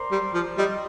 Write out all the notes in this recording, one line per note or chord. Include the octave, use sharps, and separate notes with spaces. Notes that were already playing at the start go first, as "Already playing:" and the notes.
Already playing: A#4 C5 D5
G3
F3
G3 D#5